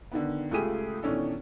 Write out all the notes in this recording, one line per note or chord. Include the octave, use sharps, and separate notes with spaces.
D3 D#3 B3
C#2 A3 F4 G4 G#4 D#7
B2 D#3 E3 C#4 D4 A4